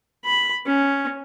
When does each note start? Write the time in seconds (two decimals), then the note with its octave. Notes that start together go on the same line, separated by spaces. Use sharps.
0.25 B5
0.67 C#4